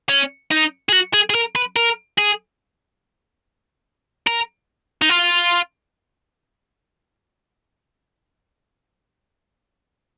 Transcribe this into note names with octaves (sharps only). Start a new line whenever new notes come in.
C#4
D#4
G#4
F#4
G#4
G#4
A#4
B4
A#4
G#4
A#4
D#4
F4